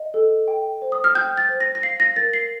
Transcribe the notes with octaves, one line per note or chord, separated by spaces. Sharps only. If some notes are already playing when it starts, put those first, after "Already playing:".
Already playing: D#5
A4
G5
C5
D#6
F6
G5 G6
A6
C5
A#6
A#6
F5 C7
A#6
A#4 A6
C7